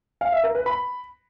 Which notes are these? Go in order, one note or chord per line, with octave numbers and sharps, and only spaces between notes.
F5
E5
A#4
B4
B5